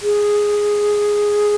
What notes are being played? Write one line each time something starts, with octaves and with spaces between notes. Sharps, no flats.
G#4